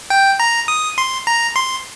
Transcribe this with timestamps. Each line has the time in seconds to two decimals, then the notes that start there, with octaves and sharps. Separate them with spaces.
0.10 G5
0.40 A#5
0.68 D#6
0.98 C6
1.27 A#5
1.56 C6